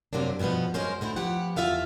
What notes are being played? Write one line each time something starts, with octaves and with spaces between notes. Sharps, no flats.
F#2 C3 F#3 A#3 D4
G2 B2 E3 F3 B3
F#2 G#3 C#4 A#4 C5
D2 D3 E4 C5
F3 B3 G4 F#5
E2 D#3 F4 E5 F5 A5